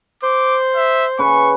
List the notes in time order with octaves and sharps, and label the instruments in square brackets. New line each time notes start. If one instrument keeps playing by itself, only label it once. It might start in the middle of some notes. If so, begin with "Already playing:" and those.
[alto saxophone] C5 [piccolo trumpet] D6
[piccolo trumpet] E5
[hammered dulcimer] C#3 B4 [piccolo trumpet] C#6